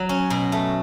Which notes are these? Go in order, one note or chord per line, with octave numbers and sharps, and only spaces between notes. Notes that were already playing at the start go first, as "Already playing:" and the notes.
Already playing: F#3
C#4
B2
A3